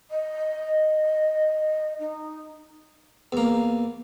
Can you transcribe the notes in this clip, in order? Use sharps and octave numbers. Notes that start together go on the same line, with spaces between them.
D#5
D#4
E2 A#3